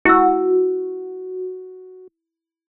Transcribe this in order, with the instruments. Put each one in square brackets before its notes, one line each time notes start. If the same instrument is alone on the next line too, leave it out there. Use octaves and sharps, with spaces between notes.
[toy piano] E4 E6 [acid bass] F#4